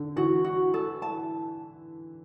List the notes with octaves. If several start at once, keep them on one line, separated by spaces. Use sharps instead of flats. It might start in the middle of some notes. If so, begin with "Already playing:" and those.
Already playing: D3
E3 F#4
F#4
A4
A5